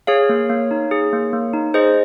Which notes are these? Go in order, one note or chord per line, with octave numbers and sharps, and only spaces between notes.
G#4 C#5 F5
A#3
A#3
D#4
G#4
A#3
A#3
D#4
G#4 C5 D#5